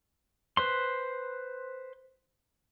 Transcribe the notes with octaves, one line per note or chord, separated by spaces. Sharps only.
B4 C5 C6